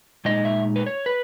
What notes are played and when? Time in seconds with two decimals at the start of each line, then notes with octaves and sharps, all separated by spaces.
0.25 A#2 G#3 D#4 D#5
0.45 E5
0.76 B4
0.86 C#5
1.06 B4